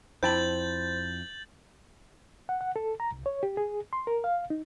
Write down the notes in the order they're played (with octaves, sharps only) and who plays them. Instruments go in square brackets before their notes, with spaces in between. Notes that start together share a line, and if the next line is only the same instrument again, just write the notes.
[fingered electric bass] F2 [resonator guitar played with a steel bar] E4 G5 A5 [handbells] C5 [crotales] G6 A6 F#7
[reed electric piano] F#5
F#5
A4
A#5
C2
C#5
G4
G#4
C6
A#4
F5
D#4